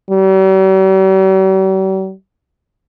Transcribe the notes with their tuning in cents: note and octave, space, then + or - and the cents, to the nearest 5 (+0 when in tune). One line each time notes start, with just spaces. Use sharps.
G3 -45